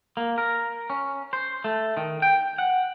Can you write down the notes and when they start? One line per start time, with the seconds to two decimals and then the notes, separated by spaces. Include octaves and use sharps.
0.17 A#3
0.38 A#4
0.90 C#4
1.33 C5
1.64 A3
1.97 D#3
2.22 G5
2.58 F#5